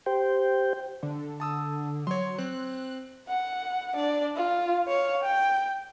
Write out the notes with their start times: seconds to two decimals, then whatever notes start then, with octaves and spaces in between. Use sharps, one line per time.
0.06 G4 C5 G5
1.03 D3
1.40 A5 D#6 E6
2.07 F#3 C#5 C6
2.39 C4 F#6
3.29 F#5
3.95 D4 D5
4.36 F4
4.88 C#5 F5
5.23 G5